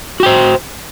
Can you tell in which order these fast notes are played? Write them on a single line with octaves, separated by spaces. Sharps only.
F#4 G5 C5